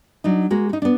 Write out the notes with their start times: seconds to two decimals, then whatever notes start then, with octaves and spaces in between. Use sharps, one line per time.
0.24 F#3 D4 D#4
0.50 G#3 A#3 F#4
0.69 D#4 F#4
0.82 B3 D4